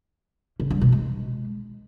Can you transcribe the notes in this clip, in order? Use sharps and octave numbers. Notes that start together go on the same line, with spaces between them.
C#3
G2
B2
G#3